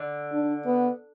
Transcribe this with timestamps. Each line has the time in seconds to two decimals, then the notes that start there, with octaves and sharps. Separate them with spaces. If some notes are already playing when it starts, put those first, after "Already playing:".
Already playing: D3
0.32 D4
0.65 B3